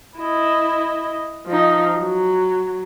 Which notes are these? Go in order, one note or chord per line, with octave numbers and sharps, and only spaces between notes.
E4 D#5
F3 D#4
F#3